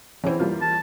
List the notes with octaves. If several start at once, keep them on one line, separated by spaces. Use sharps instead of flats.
E2 E3 C4 C#4
G3 A#3 F4
A5